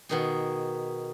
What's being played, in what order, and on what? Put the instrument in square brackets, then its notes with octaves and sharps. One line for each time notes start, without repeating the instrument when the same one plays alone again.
[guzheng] B2 D#3 G#4